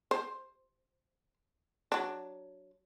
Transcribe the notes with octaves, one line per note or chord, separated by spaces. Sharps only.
C5
F#3 D4